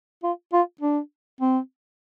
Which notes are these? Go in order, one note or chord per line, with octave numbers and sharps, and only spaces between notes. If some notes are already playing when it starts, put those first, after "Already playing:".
F4
F4
D4
C4